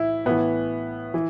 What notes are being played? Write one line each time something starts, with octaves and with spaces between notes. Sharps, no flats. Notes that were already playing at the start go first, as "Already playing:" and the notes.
Already playing: A2 E3 E4
A2 E3 B3
E3